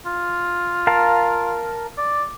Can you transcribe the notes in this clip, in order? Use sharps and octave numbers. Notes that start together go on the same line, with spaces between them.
F4
A#4 F5 A5
D5